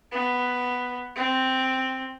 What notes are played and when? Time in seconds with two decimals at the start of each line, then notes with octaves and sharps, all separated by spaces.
0.12 B3
1.16 C4